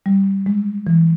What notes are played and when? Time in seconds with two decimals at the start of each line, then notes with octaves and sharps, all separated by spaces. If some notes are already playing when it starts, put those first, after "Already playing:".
0.06 G3
0.46 G#3
0.87 E3